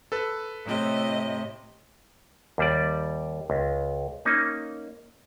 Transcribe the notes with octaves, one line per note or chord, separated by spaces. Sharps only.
A4 B4
A2 C3 D#5
D#2 G3 D5
C#2
A#3 C#4 D#4